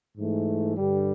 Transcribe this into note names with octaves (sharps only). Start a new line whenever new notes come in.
G#2 E3 A3
G2 D3 G3